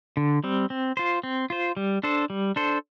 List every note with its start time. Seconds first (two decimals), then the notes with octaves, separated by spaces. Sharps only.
0.17 D3
0.44 G3 C4
0.70 C4
0.97 F4 C5
1.23 C4
1.50 F4 C5
1.77 G3
2.03 D4 A4 C5
2.30 G3
2.56 D4 A4 C5